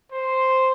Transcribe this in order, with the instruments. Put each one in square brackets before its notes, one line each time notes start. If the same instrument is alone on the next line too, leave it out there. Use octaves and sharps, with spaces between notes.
[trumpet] C5